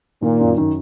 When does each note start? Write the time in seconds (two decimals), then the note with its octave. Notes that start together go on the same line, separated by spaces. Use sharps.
0.22 A#2 D#3
0.40 F#2
0.57 D#3